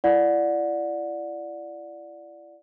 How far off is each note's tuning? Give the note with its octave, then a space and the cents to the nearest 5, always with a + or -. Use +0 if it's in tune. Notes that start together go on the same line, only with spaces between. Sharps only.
E4 +35 D5 +0 F#5 -25